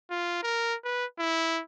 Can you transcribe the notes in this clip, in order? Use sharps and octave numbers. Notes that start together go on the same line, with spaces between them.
F4
A#4
B4
E4